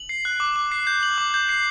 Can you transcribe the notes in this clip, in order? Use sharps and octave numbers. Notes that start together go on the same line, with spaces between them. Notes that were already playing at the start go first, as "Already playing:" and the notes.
Already playing: F#7
C7
F#6
D6
D6
C7
G6
F#7
D6
G6
C7